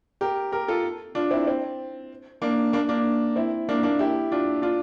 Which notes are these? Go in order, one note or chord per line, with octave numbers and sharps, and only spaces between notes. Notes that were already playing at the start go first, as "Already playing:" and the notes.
G4 A#4
G4 A#4
F4 A4
D4 F4
C4 E4
C4
A#3 D4
A#3 D4
A#3 D4
C4 E4
A#3 D4
A#3 D4
E4 G4
D4 F4
D4 F4